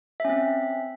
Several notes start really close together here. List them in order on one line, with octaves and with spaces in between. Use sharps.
E5 C#4 C4